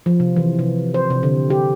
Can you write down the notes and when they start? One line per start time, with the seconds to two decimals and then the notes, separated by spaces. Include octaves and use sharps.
0.06 F3
0.20 C3
0.36 E3
0.59 C3
0.94 C5
1.10 C3
1.23 D3
1.50 G4